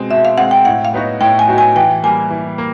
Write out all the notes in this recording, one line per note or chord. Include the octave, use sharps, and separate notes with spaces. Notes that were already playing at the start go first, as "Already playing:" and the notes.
Already playing: B2 G#3 C4
B2 E5
F5
G#3 C4 F#5
G5
A2 F#5
F5
F#3 B3 D#4 F#4
A2 G5
G#5
F#3 B3 D#4 F#4
G#5
E3 G5
G3 A#3 G#5
E3
A#3